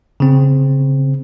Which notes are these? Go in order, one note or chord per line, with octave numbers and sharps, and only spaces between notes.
C#3 C4